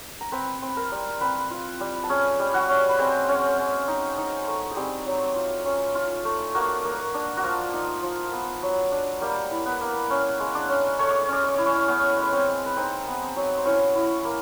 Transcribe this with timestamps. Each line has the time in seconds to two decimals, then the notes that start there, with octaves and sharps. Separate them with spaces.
0.21 A#5
0.32 C4 B4 B5
0.62 C4
0.77 A#4 A#5
0.91 G3
1.21 C4 B4 B5
1.51 F4
1.80 G3
2.04 A5
2.10 C#4 G#4 G#5
2.39 G3
2.54 F#4 F#5
2.69 C#4
2.89 B4
2.99 G#3 C4 C5
3.29 C#4
3.58 C#4
3.88 D#4
4.18 D#4
4.47 A3
4.71 G#4
4.76 G3 C4 G4
5.06 F#3
5.36 F4
5.65 C#4
5.95 F4
6.25 A3
6.55 A#3 F#4
6.85 A#3
7.14 D4
7.37 F#4
7.44 F3 F4
7.73 D#4
8.03 F3
8.32 B3
8.63 F#3
8.92 D4
9.21 G3 A#3 G4
9.51 E4
9.66 B3 B4
9.81 A#3
10.10 C#4
10.40 G#3
10.55 D4 D5
10.69 C#4
10.99 A3 C#5
11.10 D5
11.21 C#5
11.29 C#4 D5
11.43 C#5
11.54 E4 D5
11.66 C#4 C#5
11.88 B3 C#4 C#5
12.18 G#3 B4
12.32 C4 C5
12.48 G#3
12.66 B4
12.77 C4 D#4 C5
13.07 B3
13.36 F#3
13.58 C5
13.65 C#4 E4 C#5
13.96 E4
14.25 A#3